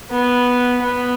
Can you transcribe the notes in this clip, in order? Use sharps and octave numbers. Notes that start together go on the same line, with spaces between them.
B3
B3